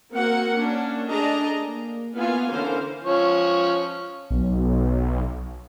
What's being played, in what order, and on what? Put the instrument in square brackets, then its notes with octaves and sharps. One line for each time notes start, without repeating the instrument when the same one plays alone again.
[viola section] A#3 C4 F#4 A#4 F#5
A#3 C#4 D4
A3 D4 G#4 D#5 A#5
A#3
A#3 B3 E4 F4 F5 G#5
D3 E3 C#4 A#4 C5 F5
[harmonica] F3 C#4 C#5
[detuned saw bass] B1